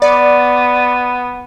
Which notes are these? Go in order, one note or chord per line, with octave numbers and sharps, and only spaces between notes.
B3 D5